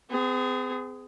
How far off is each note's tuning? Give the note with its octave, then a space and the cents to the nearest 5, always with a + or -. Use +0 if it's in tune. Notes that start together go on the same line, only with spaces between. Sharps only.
C4 -45 G#4 +0